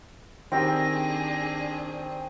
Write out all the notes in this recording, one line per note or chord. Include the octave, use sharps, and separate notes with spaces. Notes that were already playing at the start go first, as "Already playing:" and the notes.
D#3 C4 D4 G4 G#4 G5 A#6